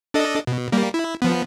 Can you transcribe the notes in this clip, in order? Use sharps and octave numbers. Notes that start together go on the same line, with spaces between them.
D4 A4 D#5
B2
G3 A#3
E4
F3 B3